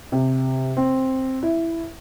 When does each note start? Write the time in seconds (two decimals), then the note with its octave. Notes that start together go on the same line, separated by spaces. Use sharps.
0.12 C3
0.77 C4
1.43 E4